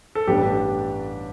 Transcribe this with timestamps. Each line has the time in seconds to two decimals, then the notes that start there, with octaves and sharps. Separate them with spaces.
0.15 A4
0.27 A1 G2 G3 B3 D4 G4